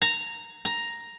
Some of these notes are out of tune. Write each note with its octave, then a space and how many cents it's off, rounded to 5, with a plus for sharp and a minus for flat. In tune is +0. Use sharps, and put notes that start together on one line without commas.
A#5 -10
A#5 +5